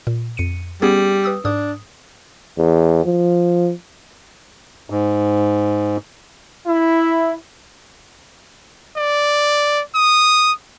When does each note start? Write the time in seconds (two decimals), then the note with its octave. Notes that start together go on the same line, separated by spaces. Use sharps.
0.07 A#2
0.37 F2 C#7 D#7
0.82 G3 B3 C#4 G#4
1.24 B4 D#6 E6
1.45 G#2 D4 D#6
2.58 E2
3.05 F3
4.90 G#2
6.67 E4
8.97 D5
9.95 D#6